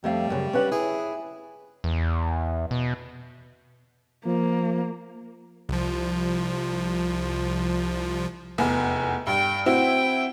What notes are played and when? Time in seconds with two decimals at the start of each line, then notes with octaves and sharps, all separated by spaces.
0.04 F2 G3 A3 F5
0.30 F#2 A#2 C#3
0.53 C#4 B4 F#5
0.71 E4 G#4
1.84 E2
2.71 B2
4.25 F3 A#3
5.69 C2 F3
8.58 F1 E2
9.27 G2 G5
9.66 C4 E4 F#4 G5